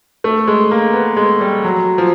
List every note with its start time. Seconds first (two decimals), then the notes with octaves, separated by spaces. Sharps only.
0.24 A3
0.47 G#3
0.71 A#3
0.93 B3
1.17 G#3
1.41 G3
1.64 F#3
1.98 F3